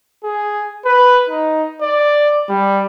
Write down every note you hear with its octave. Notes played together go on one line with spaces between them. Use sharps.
G#4
B4
D#4
D5
G3